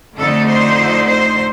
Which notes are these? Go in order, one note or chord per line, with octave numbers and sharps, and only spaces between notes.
F2 D3 A3 D#4 A4
C5
C5